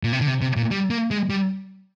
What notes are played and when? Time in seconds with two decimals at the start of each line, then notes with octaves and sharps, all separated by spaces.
0.03 A#2
0.13 C3
0.21 D3
0.27 C3
0.42 C3
0.56 A#2
0.71 G3
0.90 A#3
1.11 G#3
1.30 G3